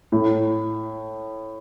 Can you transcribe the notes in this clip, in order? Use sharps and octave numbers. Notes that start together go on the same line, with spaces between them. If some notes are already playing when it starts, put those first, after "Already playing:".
A2